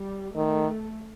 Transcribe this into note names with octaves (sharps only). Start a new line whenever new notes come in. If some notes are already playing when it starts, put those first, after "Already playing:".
Already playing: G3
D#3 A3